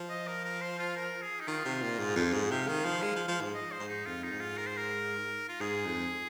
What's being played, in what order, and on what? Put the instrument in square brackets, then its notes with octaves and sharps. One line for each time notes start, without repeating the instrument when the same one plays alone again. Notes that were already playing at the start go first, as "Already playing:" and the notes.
Already playing: [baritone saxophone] F3
[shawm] D#5
A#4
A#4
C5
F4
A#4
G#4
D#4
[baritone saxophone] D#3 [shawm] F4
[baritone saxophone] C3
A#2
G#2
F2
G#2
[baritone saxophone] C3 [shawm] F5
[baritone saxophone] D#3
F3
G#3
F3
F3
G#2
[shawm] D#5
C5
[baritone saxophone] G#2
[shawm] D#4
[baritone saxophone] F2 [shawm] F4
[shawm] D#4
[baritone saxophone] G#2
[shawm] F4
A#4
C5
A#4
F4
[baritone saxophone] G#2 [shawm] G#4
[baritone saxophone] F2